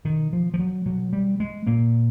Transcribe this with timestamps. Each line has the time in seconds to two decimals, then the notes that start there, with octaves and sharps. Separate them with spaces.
0.05 B2 D#3
0.33 F3
0.54 F3
0.59 F#3
0.86 B2 F#3
1.13 G3
1.40 G#3
1.67 A#2 A#3